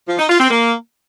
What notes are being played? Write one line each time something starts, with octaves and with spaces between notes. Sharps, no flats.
F3
D#4
F4
C4
A#3